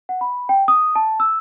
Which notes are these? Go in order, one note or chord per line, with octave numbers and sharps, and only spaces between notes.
F#5
B5
G5
D#6
A5
E6